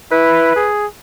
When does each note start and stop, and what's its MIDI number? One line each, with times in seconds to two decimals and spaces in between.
0.12 0.52 64
0.12 0.69 71
0.56 0.86 68